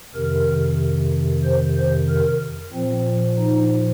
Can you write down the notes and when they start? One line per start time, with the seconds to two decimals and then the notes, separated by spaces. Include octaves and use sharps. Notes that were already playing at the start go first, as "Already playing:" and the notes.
0.14 F2 C3 D#3 A#4
1.43 C5
1.76 C5
2.08 A#4
2.73 A#2 F3 C4
3.38 D#4